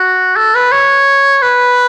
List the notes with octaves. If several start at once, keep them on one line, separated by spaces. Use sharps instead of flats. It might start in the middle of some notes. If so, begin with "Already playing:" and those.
Already playing: F#4
A4
B4
C#5
B4